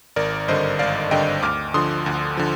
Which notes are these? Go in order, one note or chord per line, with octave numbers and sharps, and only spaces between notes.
G#1 A#4 D5
G2 D3 C5 D#5
G#1 D5 F5
G2 D3 D#5 G5
D2 D6 F6
D3 F3 C6 D#6
D2
D3 F3